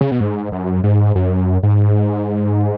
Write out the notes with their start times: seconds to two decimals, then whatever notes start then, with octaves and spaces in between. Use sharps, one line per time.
0.01 C#3
0.11 B2
0.20 G#2
0.52 F#2
0.83 G#2
1.15 F#2
1.63 G#2